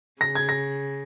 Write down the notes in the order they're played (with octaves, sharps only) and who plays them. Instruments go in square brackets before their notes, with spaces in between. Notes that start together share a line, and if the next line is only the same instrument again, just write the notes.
[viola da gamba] C#3 [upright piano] A#6
[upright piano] G#6
A#6